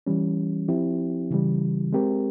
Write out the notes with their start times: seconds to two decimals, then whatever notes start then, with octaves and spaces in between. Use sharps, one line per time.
0.07 E3 G3 C#4
0.68 F3 C4 E4 G4
1.30 C#3 E3 G3
1.93 G#3 C4 G4 A#4